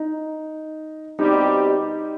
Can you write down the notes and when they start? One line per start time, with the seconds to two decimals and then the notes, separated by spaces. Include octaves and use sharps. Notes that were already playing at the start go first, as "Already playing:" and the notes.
Already playing: D#4
1.19 B2 G3 C4 D#4 G4